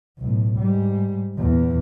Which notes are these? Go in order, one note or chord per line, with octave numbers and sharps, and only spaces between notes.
B1 A2
G#2 G3
E2 A#2